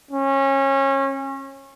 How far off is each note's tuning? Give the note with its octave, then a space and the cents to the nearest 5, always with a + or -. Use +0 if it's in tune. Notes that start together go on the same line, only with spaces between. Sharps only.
C#4 -25